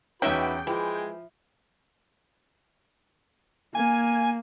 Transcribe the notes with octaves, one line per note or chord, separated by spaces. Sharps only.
E2 F#3 C#4 D#4 F#4 B4 E5 G5
E3 F3 G#3
A#3 G#5